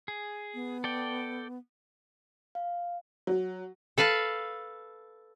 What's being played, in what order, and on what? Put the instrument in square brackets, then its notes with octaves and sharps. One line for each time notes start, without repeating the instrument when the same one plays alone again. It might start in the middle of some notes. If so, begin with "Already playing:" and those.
[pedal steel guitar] G#4
[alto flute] B3
[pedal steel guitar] A4 D5 G5
[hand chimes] F5
[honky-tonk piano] F#3
[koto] A4 B4 F5 A5